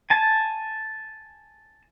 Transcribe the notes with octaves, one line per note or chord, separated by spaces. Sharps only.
G#5 A5